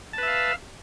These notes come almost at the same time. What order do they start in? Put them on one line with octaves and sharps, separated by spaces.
A5 B4 E5 F5